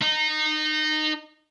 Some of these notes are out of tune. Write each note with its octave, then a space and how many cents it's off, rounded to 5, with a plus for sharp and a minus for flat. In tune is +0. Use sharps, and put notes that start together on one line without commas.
D#4 -20